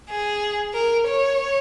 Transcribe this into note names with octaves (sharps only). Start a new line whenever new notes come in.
G#4
A#4
C#5